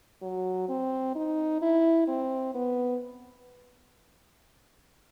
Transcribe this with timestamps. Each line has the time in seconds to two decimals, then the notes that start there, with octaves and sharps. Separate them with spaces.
0.22 F#3
0.69 C4
1.15 D#4
1.62 E4
2.08 C4
2.55 B3